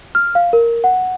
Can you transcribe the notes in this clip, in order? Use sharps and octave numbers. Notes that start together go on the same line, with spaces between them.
F6
F5
A#4
F#5